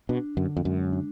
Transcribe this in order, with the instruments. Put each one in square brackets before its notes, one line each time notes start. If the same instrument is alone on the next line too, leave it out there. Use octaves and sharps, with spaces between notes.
[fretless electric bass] B2 [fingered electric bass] D4
[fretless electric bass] F#2 [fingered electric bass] D3
[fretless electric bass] F2
[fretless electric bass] F#2 [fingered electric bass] G#3
[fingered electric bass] D4